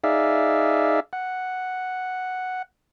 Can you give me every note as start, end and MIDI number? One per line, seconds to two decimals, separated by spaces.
0.04 1.00 63
0.04 1.00 68
0.04 1.00 74
0.04 1.00 76
0.04 1.00 77
1.13 2.62 78